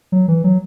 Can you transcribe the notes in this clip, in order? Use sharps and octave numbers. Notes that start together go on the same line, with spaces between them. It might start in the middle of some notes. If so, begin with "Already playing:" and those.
F#3
E3
F#3